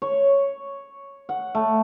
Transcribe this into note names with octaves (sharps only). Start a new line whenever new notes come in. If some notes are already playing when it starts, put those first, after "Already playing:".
C#5
F#5
A3